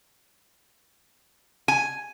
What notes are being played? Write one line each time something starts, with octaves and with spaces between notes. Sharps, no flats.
G#5